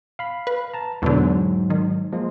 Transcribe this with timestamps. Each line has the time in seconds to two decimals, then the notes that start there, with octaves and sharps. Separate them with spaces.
0.19 F5 B5
0.47 B4
0.74 A5 A#5
1.02 E2 G#2 B2 D3 F#3
1.70 D#3
2.12 F3 G#3 A#3